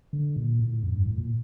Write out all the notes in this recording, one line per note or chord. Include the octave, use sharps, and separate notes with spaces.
D3
A#2
A2
F2
G2
A2
A#2